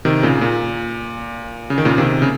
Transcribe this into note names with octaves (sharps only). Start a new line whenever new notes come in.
C3 D#3
A#2 C#3
A#2
C#3
D#3
A#2 C#3
C3 D#3
C#3